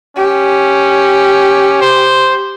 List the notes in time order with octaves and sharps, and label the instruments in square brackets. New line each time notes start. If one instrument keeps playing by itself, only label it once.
[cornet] C#4 [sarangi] G4
[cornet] C5